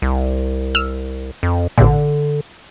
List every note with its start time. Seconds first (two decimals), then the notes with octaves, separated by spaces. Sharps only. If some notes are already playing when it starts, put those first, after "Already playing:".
0.02 C2
0.75 E6 F6
1.43 F2
1.78 A1 A#2 D3